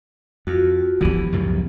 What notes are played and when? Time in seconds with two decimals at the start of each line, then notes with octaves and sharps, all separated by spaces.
0.47 F2 F4 F#4
1.01 D3 E3 F3 B3 G4
1.32 C#2 F#2 A2